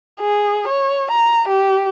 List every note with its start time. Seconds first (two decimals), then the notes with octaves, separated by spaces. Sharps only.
0.20 G#4
0.68 C#5
1.11 A#5
1.48 G4